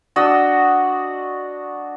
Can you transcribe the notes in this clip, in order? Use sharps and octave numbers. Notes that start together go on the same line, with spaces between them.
D4 F#4 D#5 E6